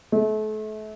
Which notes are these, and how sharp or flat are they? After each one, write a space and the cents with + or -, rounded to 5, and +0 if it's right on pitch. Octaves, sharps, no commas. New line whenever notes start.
A3 -35